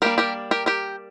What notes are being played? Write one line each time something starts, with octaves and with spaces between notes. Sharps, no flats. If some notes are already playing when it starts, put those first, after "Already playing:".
G3 A#3 D4 G4 A#4
G4 A#4
G4 A#4
G4 A#4